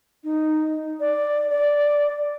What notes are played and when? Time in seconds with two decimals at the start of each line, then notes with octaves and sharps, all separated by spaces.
0.24 D#4
1.00 D5
1.50 D5